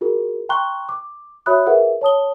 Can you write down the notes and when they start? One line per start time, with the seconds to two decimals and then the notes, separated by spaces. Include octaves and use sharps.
0.01 F4 F#4 G#4 A#4
0.49 G5 A#5 C6 C#6 F#6 G7
0.89 D6
1.46 F#4 C#5 E5 B5 D#6 F#6
1.66 F4 G#4 A#4 B4 E5 F#5
2.01 C#5 A5 D#6 G7